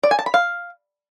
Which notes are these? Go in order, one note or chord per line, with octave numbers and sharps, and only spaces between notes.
D5
G#5
A5
B5
F5